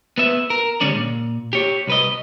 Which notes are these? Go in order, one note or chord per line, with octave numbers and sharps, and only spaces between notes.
B3 B4 E5
A#4
D3 G3 G#3 C#4 D5
A#2
G4 C#5
C2 B4 D#5